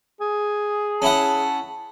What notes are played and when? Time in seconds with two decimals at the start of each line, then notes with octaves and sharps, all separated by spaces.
0.20 G#4
1.02 C#4 E4 F#5 A5